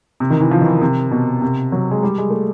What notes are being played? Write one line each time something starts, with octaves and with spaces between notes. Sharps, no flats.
C3
D#3
E3
F3
D#3
E3
C3
B2
C3
F#3
G#3
G3
G#3
A3